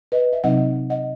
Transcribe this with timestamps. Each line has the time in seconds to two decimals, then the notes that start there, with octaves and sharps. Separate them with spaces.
0.12 B4 D#5
0.33 E5
0.44 C3 F#3 C4 D#4 D#5 F#5
0.90 D#5 F#5